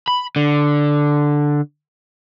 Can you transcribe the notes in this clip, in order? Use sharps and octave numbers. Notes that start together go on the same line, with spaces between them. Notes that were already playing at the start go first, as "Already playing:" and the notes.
B5
D3